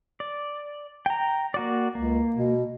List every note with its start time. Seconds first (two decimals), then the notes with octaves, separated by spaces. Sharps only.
0.20 D5
1.06 G5 A#5
1.54 A#3 F#4 D5
1.95 C#2 A#3
2.36 B2